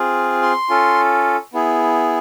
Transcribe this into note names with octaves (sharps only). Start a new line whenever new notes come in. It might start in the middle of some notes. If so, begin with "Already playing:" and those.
Already playing: C4 F4 G#4
C6
C#4 F4 A4
B3 E4 G#4